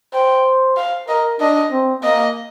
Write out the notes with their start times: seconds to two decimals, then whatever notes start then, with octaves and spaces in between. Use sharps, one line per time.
0.14 C5 G5
0.77 F5
1.08 A#4 D#5
1.40 D4 D#5
1.71 C4
2.03 A#3 D#5